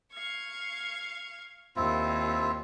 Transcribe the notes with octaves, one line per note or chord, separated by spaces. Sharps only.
F5 C#6 G#6
D#2 C4 E4 F4